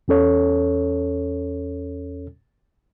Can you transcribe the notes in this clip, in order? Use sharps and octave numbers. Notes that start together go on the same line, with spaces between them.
E2 C#4 A4 C#5